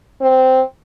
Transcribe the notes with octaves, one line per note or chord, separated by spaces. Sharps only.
C4